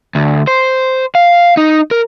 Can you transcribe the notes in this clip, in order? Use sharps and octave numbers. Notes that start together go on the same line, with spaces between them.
D2
C5
F5
D#4
A#4